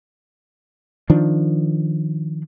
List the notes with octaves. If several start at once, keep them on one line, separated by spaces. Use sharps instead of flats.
D#3 F3 D4